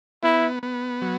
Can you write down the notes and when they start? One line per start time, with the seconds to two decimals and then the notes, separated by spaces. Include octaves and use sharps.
0.23 B3 E4
0.63 B3
1.02 F#3